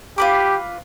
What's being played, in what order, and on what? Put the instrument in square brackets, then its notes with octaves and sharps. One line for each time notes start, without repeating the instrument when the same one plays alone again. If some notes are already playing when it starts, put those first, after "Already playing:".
[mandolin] F4 B4 D6 [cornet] G4